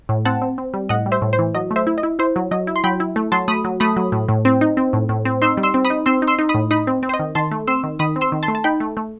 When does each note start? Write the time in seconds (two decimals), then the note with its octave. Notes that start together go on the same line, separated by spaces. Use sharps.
0.09 A2
0.25 C4 F#5 A5
0.42 C4
0.58 C4
0.74 G3
0.89 A2 D#5 F#5
1.06 G3
1.12 C5 E5
1.22 A2
1.33 C5
1.39 E3
1.55 F#3 D#5
1.71 A3
1.76 C5 E5
1.87 E4
1.98 D#5
2.03 E4
2.19 E4 C5
2.36 F#3
2.51 F#3 D#5
2.67 E4
2.76 C6
2.84 F#3 G5 B5
3.00 E4
3.16 A3
3.32 F#3 A5 C6
3.48 A3 B5 D#6
3.64 F#3
3.80 A3 B5 D#6
3.96 F#3
4.12 A2
4.28 A2
4.45 C4
4.61 D#4
4.77 C4
4.93 A2
5.09 A2
5.25 C4
5.42 D#4 C6 E6
5.57 G3
5.63 C6 E6
5.74 C4
5.85 B5 D#6
5.90 D#4
6.06 C4 C6 E6
6.22 D#4
6.28 C6 E6
6.39 D#4
6.49 B5 D#6
6.54 A2
6.71 D#4 B5 D#6
6.87 C4
7.03 C4
7.09 C5
7.14 D#5
7.20 D#3
7.35 D#3 A5 C6
7.51 A3
7.67 C4 C6 E6
7.84 D#3
7.99 D#3 B5 D#6
8.16 C4
8.21 C6 E6
8.32 D#3
8.43 A5 C6
8.48 A3
8.55 A5
8.64 D#4 G5 B5
8.80 A3
8.97 A3